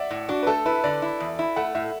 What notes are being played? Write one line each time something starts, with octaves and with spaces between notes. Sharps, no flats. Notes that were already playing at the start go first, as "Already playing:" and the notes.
Already playing: D5 E5 F#5
A2
D4 F#4
B4
A3 A4
E4 B4
D3 D5
E4
E2
E4
A3 F#5
A2 E5